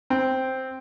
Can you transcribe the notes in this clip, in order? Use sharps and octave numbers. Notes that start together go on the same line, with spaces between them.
C4